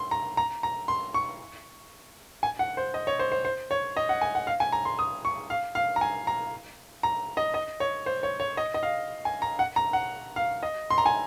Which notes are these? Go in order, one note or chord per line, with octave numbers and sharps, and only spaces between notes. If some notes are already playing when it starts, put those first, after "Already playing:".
Already playing: C6
A#5
A#5
A#5
C6
C#6
G#5
F#5
C5
D#5
C#5
C5
C5
C5
C#5
D#5
F#5
G#5
F#5
F5
G#5
A#5
C6
D#6
C#6
F5
F5
A#5
G#5
A#5
A#5
D#5
D#5
C#5
C5
C#5
C#5
D#5
D#5
F5
G#5
A#5
F#5
A#5
F#5
F5
D#5
C6
A#5
G#5